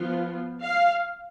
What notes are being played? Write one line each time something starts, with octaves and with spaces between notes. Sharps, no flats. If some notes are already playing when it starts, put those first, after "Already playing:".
Already playing: F3 B3 F4
F5